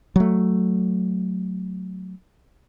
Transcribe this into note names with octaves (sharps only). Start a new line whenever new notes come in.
F#3 A3